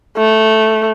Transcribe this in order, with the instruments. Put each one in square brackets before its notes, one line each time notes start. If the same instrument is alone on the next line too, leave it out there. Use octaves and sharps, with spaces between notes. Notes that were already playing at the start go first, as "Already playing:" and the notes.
[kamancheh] A3